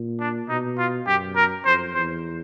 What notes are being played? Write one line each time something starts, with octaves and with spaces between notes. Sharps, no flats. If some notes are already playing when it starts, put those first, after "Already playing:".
Already playing: A#2
D4
B2 D#4
F4
F#2 G4
A#4
F2 C5
E2 C5